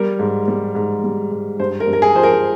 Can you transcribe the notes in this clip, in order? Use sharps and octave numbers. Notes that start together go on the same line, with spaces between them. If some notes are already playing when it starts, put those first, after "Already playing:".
Already playing: G3 A#4
G#2
G3
G#2
G3
G#2
G2 C5
A#4
G2
A#4
G#4
F3 C5
A#4